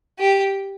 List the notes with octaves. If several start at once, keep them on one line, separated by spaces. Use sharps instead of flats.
G4